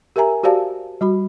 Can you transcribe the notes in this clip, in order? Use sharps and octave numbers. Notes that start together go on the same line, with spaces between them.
G4 A#4 E5 G#5 A#5
F#4 G4 C5 D5 F5 A5
G3 F#4 B5